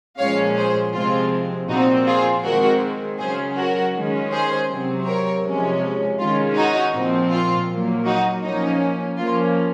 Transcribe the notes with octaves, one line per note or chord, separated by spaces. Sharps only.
A#2 F3 G#3 C#4 C#5 F5
G#4 C5
C3 F3 G#3 C4 F4
A#2 F3 C4 D#4 F#4
F4 G#4
D#3 G#3 C4 F#4 A#4
C#3 F#3 C#4 G#4 C5
F#4 A#4
D#3 G#3 C#4
G#4 C5
C3 F#3 C4
A#4 C#5
C3 F3 G#3 C#4
D#3 G#3 C#4 F4
D#4 F#4
A#2 F3 C4
F4
A#2 F#3 A#3
D#4 F#4
F3 A#3 C#4 D#4
F3 A#3 C#4 F4